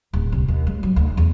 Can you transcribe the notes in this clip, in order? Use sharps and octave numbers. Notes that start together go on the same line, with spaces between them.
D1
C2
D#2
G#3
F#3
D2
E2